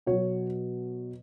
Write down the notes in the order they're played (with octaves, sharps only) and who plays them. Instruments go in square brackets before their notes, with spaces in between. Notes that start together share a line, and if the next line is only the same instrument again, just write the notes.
[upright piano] B2 F#3 C#5